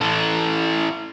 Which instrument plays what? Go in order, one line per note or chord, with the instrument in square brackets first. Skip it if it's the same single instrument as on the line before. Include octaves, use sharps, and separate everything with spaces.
[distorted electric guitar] E3 A4